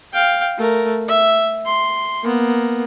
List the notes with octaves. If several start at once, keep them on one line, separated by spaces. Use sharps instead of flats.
F5 G5
A3 A#4
E5
C6
A#3 B3